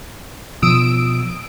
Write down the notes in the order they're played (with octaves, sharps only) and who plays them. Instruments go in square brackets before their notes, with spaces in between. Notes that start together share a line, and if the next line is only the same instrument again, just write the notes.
[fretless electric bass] B2 F3 [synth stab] D#6 E6 D7